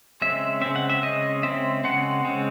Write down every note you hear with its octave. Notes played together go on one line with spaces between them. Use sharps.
C#3 G#3 C4 E5
C#3 G#3 C4 E5
F#5
E5
C#3 G#3 C4 D#5
C#3 G#3 C4 E5
C#3 G#3 C4 F#5
C#3 G#3 C4